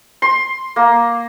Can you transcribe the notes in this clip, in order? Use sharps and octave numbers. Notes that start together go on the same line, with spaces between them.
C6
A#3